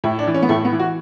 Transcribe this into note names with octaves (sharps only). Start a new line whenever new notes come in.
A2 E4
D4
E3
C#4
B3
A2 A3
B3
E3
F#4